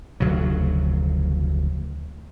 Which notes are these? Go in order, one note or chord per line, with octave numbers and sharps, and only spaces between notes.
F1 D2 C#3 F#3